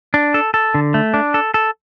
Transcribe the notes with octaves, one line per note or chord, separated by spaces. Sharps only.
D4
A4
A4
D3
A3
D4
A4
A4